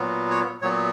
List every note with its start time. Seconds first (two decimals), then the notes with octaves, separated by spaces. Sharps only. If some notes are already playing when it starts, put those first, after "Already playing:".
Already playing: A#2 F#3 B3
0.30 C#5
0.62 A#2 F#3 B3 C#5